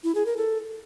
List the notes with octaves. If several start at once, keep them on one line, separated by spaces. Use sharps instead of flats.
E4
G#4
A#4
A4